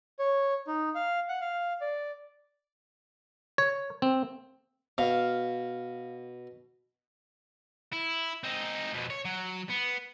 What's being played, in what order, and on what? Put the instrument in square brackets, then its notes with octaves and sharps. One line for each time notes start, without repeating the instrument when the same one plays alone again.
[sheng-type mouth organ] C#5
D#4
F5
F#5
F5
D5
[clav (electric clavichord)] C#5
C4
[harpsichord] B2 [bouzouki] F5
[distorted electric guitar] E4
C4 D#4
F2 B2
C#5
F#3
B3